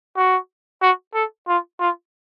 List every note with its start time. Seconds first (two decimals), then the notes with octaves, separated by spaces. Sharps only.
0.17 F#4
0.81 F#4
1.14 A4
1.47 F4
1.80 F4